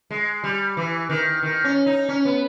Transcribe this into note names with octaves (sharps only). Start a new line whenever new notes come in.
G#3
G3
E3
D#3
D#3
C#4
D#4
C#4
B3